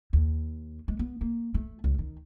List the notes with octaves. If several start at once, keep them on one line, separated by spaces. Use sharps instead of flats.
D#2
G#3
B3
A#3
A3
C#2
D#3